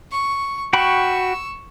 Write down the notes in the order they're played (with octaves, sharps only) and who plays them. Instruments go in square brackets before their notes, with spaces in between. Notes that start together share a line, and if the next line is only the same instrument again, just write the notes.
[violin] C#6
[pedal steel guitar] F#4 G5 B5 [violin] C#6 E6